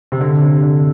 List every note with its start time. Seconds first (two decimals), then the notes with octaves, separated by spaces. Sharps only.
0.12 C3
0.20 D3
0.41 C3
0.63 D3